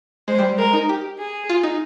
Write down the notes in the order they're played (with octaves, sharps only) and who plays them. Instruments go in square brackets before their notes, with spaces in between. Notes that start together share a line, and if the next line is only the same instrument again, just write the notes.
[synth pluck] G#3 [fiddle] C5
[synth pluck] G3
G3
[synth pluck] G#3 [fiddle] A#4
[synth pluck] D#4
G4
[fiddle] G#4
[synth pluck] F4
D#4